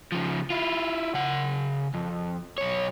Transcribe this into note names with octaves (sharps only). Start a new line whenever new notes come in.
C#3 F3
E4 F4
C#3 F#5
F2
B1 C#5